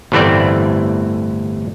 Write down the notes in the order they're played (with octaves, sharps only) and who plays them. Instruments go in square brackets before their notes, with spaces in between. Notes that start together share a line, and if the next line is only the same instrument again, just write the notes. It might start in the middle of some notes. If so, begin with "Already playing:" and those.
[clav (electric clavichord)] G1 A2 E3 A3 C4 D5